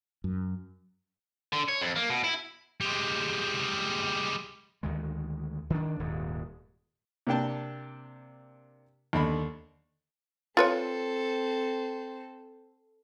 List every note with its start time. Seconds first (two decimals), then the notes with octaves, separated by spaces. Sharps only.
0.24 F#2
1.53 D3
1.68 C#5
1.81 F2
1.96 A#3
2.10 B2
2.24 E4
2.81 G3 G#3
4.83 D2 D#3 G#3
5.70 D#3 D4
6.00 D#1 D#2 G#2
7.27 C3 A#3 D4 G5 A5
9.13 D#2 D3 B5
10.57 C4 F4 A4 B4 C#5